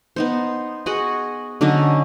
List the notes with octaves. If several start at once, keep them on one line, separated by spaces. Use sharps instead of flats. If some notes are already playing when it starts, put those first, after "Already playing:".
B3 D#4 C5
F#4 G#4 D#5 F#5
D3 F#3 C#4 D#4